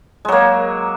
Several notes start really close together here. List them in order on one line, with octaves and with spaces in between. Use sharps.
G#3 F#3 A#3